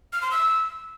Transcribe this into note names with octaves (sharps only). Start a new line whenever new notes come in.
F6
C6
E6